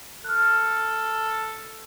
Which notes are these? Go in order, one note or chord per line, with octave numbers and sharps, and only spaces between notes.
A4 F6 F#6